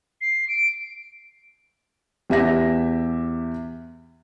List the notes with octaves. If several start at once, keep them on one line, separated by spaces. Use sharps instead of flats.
C7
D7
E2 G4 E5 A#6